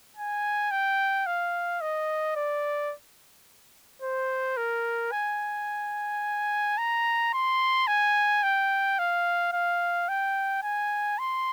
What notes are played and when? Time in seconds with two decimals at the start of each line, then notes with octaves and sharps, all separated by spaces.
0.16 G#5
0.71 G5
1.26 F5
1.81 D#5
2.36 D5
4.02 C5
4.57 A#4
5.12 G#5
6.78 A#5
7.33 C6
7.87 G#5
8.43 G5
8.99 F5
9.53 F5
10.09 G5
10.63 G#5
11.19 C6